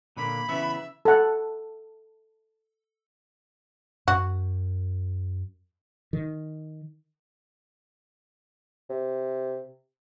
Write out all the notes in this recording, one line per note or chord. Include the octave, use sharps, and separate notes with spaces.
A#2 D3 A#3 B5
C#3 E3 B3 E5
A4 F#5
F#2 F#4
D#3
C3